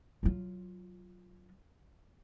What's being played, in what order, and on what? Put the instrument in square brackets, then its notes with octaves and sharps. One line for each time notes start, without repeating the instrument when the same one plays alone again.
[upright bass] F#3 F4